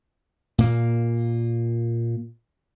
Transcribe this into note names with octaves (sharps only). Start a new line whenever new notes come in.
A#2 A#3